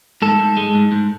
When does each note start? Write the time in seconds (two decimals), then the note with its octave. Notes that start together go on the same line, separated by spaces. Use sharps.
0.22 G#2 A4
0.40 G#2
0.57 G#3
0.75 G#2
0.92 G#2